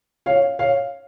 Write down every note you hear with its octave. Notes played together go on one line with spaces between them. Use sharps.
C#5 F5
C#5 F5